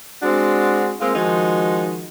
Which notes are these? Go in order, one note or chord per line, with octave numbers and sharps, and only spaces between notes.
G#3 C4 D4 F#4
G#3 A#3 C4 F4
D#3 F3 G#3 D#4 F#4